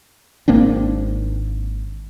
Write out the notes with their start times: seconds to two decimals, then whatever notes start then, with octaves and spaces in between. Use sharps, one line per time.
0.48 G#1 A#3 C4 D4